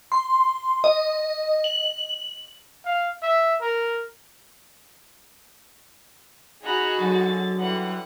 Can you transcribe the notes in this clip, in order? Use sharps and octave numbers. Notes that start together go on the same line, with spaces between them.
C6
D#5
F#7
F5
E5
A#4
D#4 F#4 G#4 A#5 B5 F#6
D3 F#3 A6
D3 E3 G3 F#5